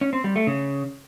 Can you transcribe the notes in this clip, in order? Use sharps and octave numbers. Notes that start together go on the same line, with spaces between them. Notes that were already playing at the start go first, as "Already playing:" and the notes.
C#4
C4
G3
A3
C#3